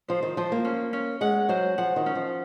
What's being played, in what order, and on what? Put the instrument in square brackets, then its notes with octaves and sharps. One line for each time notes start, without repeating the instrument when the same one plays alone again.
[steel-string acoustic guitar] F3 [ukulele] C5
[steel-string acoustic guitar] D#3
[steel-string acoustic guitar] F3 [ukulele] C5
[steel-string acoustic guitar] A#3
[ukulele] C#4
C#4
[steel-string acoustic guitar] G#3 [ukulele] F#5
[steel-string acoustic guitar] F#3 [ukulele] C5
[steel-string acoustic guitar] F3 [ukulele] F#5
[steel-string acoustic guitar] D#3
[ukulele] C#4
[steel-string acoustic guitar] F3